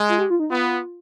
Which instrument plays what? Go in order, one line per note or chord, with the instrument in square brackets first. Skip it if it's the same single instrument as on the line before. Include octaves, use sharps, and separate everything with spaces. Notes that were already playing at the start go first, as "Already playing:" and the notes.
Already playing: [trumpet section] G#3
[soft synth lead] F4
G4
F4
D#4
[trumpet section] B3 [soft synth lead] F4